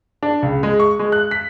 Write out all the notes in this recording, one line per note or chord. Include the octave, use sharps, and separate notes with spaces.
D4
C#2
G#3
C#6
G#3
F#6
B6